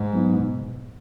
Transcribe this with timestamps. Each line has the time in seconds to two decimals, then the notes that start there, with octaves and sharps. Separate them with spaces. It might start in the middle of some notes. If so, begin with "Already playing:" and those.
Already playing: G#2
0.13 F#3 B3 D#4
0.40 B2